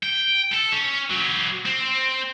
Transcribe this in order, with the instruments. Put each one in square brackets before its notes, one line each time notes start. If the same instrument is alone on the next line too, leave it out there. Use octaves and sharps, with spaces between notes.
[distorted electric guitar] G5
A4
C#4
F#3 G4
C4